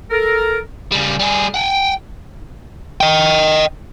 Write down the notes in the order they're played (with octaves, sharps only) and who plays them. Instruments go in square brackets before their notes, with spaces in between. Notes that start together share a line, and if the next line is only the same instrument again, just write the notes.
[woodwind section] A4 A#4
[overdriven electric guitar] C#3 G3
G3 G#4
F#5 G5
[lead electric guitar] D#5 G5